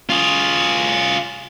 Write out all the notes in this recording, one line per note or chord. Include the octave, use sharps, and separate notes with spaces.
F4 G#4